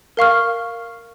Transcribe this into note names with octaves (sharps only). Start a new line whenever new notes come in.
A#4 F5 C#6 F6